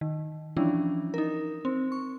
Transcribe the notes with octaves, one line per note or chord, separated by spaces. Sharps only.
D#3
E3 F3 G3 C#4 D4 E4
D#4 A#4
C4
C#6